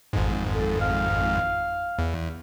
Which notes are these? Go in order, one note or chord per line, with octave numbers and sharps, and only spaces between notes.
G#1 F2 G#2
A4
F5
E2